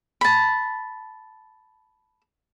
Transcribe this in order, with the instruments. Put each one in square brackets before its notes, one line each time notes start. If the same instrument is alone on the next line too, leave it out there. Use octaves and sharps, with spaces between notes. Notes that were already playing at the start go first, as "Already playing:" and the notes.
[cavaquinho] A5 B5